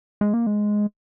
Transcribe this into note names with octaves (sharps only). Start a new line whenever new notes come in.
G#3
A#3
G#3